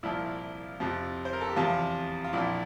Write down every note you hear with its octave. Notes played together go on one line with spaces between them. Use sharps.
C2 A#2 F3 E4
F2 C3 F3
C5
A#4
A4
G4
E2 C3 F3 F4
F4
A#1 A#2 F3 E4